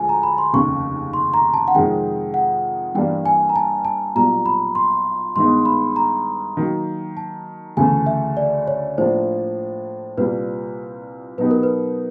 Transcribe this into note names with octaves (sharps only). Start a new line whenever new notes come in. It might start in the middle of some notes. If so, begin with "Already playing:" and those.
Already playing: D2 D3 F3 G#3 G#5
A#5
B5
C6
F1 D#2 C#3 C#6
C6
A#5
A5
F#5
F2 C3 D#3 G#3 G5
F#5
G2 E3 G3 A#3 D4 G5
G#5
A#5
A5
A5
B1 A#2 G3 A#5
B5
C6
G2 D#3 G#3 B3 D#4 C6
B5
A#5
D#3 F#3 A#3
A5
D2 C#3 E3 A3 G#5
E5
D5
C#5
A2 F3 A#3 D4 C5
C2 A#2 G3 B4
B2 F#3 B3 D#4 G4 B4
A#4
B4